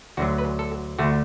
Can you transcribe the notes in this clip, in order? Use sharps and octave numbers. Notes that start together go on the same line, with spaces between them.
D2 D3 F#3 F#4
B4
A4
D2 D3 A3 F#4